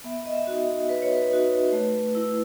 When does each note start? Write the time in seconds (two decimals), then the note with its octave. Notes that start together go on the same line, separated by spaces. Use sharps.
0.04 B3 E5
0.26 D#5
0.33 E5
0.47 D#4 F#4
0.61 D#5
0.88 B3 B4
1.02 C#5
1.15 B4
1.31 D#4 F#4
1.73 A3
2.15 E4